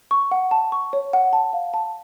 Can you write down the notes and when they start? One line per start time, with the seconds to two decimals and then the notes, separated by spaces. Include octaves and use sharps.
0.11 C#6
0.31 F#5
0.51 A5
0.72 C#6
0.93 C#5
1.13 F#5
1.33 A5
1.53 F5
1.74 A5